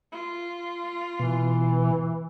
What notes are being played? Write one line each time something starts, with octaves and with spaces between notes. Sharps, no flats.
F4
B2 E3